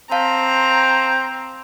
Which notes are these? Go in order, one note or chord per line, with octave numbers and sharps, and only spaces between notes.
C4 F5 A5 A#5